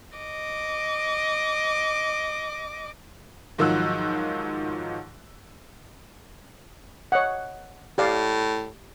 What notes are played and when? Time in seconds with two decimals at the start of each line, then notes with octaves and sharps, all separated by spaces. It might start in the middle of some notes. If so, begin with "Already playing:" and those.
0.17 D#5 D6
3.58 G#2 D#3 F3 F#3 E6 F#6
7.12 C#5 D#5 F#5
7.98 A2 G4 D5 F5